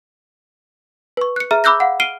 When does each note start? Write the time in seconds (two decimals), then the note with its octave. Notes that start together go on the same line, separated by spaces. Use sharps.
1.17 B4 C#6
1.36 F#6 C#7
1.51 G#4 E5 A#5 F6
1.64 B5 D6 E6 F#6 G6 A#6
1.80 F5 F#5
2.00 F6 C7 D7 D#7 G7